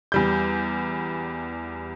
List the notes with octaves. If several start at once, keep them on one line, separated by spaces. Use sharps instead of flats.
E2 G3 G6